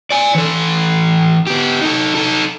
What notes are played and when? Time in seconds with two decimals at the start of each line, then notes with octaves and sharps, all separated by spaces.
0.11 D5 G#5
0.35 E3 A4
1.47 B3 G4
1.81 D#4 A4
2.15 D#4 A4